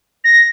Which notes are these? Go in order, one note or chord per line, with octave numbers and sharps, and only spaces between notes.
A#6